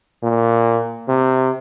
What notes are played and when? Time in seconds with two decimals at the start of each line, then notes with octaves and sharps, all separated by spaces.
0.23 A#2
1.08 C3